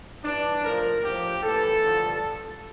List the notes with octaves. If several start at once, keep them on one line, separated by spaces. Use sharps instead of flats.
G2 E3 D4
A2 F3 A#4
A2 F3 G4
A2 E3 A4
G2 D3 F3